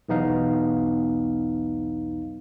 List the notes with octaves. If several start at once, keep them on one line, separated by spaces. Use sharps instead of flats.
B1 E2 B3 D#4 F5